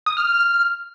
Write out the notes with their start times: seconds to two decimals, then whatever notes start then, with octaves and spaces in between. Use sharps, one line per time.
0.06 D#6
0.17 F6
0.27 F6